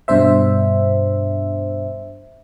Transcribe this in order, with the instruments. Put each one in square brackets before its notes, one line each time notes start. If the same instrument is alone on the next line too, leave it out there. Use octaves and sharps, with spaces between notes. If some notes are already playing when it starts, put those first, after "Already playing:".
[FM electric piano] G2 B2 D4 C5 E5